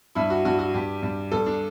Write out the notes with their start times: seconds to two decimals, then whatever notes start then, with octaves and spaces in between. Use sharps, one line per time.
0.15 G2 E4
0.30 F#4
0.45 G2 F#4
0.59 F#4
0.74 G2 G4
1.02 G2
1.31 G2 A4
1.46 D4